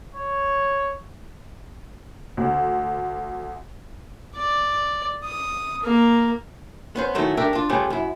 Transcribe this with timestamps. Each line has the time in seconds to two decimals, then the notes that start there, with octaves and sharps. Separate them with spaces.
0.15 C#5
2.37 D2
4.36 D5
5.24 D#6
5.83 A#3
6.96 B3 C#4 C5
7.15 D#3 F#3 A3 C#4 D#4 E4
7.37 A3 D4 G4 A#4 E5
7.53 D4 F4
7.69 C#3 G3 A3 C#4 F4 B4
7.90 F#2 E4